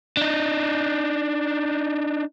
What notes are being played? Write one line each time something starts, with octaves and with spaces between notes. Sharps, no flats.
D4 D#4